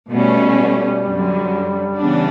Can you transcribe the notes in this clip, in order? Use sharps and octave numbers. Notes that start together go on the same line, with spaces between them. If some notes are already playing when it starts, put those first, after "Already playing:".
B2 G3 A3 C#4
F#2 D3 F#3
C#3 E3 B3 D4